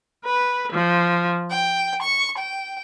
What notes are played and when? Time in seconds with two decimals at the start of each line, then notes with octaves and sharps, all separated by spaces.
0.25 B4
0.72 F3
1.50 G5
2.02 C#6
2.38 G5